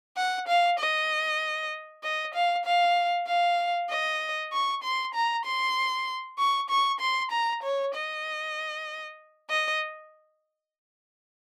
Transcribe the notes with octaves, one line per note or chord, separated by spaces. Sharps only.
F#5
F5
D#5
D#5
F5
F5
F5
D#5
C#6
C6
A#5
C6
C#6
C#6
C6
A#5
C#5
D#5
D#5